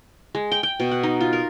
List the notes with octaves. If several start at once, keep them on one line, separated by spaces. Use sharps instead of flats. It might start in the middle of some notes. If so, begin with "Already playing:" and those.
G#3
G5
G5
B2
F#5
D#4
F4
A#4